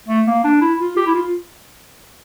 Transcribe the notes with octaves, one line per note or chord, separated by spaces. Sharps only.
A3
A#3
D4
E4
F4
G4
E4
F4